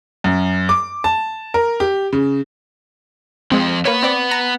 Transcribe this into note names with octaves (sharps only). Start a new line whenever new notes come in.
F#2
D6
A5
A#4
G4
C#3
F2 F3 G#3 C4
A#3 B3 B4 C#5
C4 D5
A#5